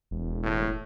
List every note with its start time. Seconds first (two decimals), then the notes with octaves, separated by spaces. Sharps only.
0.11 E1
0.43 A2